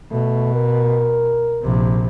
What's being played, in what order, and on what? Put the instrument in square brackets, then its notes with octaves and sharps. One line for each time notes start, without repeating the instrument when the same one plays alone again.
[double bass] B2 [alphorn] A3
[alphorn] A#4
[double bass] A#1 C3